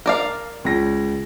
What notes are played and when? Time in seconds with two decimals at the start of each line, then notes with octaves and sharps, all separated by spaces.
0.06 A#4 D5 F5
0.65 C#2 A#6